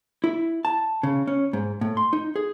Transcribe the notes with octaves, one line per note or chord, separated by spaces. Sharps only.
E4
A5
C#3
C#4
G#2
A2
C6
D#4
G#4